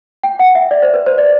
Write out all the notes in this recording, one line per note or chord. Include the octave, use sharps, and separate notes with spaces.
G5
F#5
E5
D5
C5
B4
C5
D5